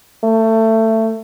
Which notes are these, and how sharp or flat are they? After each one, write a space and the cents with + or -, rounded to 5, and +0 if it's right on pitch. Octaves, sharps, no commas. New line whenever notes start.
A3 +20